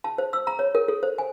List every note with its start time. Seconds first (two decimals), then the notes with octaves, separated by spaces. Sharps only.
0.04 A5
0.18 C5
0.33 E6
0.47 A#5
0.59 C#5
0.75 A#4
0.88 A4
1.03 C5
1.18 G#5